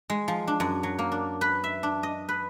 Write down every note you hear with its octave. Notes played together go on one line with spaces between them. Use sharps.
G#3
F3
D4
F#2
F#3
A#3
D4
B4
E5
D4
D#5
B4